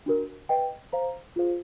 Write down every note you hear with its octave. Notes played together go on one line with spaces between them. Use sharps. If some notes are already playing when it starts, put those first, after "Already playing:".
D4 F#4 A#4
B4 D#5 G5
C5 F5 A#5
F4 G#4 C5 F5